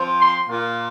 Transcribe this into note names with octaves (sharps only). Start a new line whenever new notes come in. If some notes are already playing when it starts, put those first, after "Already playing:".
Already playing: F3 C4 F4
C6
A#2 A#3 F4